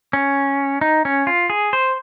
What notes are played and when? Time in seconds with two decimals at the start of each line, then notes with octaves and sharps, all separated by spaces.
0.13 C#4
0.81 D#4
1.05 C#4
1.27 F4
1.50 G#4
1.73 C5